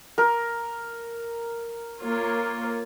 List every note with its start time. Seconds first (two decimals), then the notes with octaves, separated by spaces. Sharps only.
0.18 A#4
2.01 A#3 F4 C#5